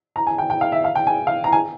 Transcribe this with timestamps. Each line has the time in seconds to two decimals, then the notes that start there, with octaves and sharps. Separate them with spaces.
0.16 A#5
0.27 G#5
0.38 G5
0.50 G5
0.61 F5
0.72 E5
0.84 F5
0.95 G5
1.07 G#5
1.27 F5
1.44 A#5
1.53 G#5